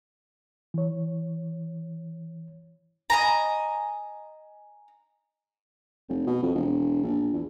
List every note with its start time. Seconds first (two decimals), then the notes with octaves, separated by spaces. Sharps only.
0.74 E3 C#5
3.10 D#5 G#5 A#5
6.09 F1
6.27 B2
6.43 F2
6.55 E1
7.03 A#1
7.34 E2